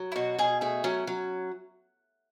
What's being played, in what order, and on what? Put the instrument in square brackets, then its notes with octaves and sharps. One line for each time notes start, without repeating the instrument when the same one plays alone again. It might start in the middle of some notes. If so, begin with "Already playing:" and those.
Already playing: [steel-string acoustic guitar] F#3
[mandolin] E4
[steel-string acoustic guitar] B2 [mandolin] F#4
[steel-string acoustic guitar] B2 [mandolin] G#4
[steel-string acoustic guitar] A3 [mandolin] G#4
[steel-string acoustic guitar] F#3 [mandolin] C#4
[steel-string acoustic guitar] F#3